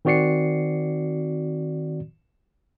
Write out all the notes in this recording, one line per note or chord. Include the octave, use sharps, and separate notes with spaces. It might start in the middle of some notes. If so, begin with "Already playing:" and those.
D#3 C4 F#4 D5 C7 C#7